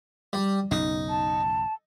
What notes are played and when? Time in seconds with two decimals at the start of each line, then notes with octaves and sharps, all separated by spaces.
0.33 G3
0.71 B1 F#2 C#3 D#4
1.10 A5